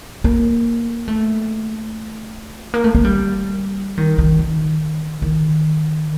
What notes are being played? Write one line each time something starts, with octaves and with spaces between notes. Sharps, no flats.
A#3
A3
A#3
A3
A#3
G3
D#3
D#3
D#3
D#3